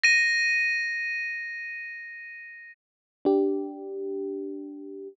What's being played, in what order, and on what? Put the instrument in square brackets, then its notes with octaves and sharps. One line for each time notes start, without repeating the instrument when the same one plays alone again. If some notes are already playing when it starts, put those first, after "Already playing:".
[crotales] A#6 D#7
[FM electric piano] D4 G4